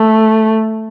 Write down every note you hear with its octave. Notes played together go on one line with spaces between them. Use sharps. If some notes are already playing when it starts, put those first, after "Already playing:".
Already playing: A3